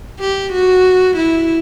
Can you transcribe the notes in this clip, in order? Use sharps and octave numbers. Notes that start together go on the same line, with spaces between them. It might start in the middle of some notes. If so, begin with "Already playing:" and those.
G4
F#4
E4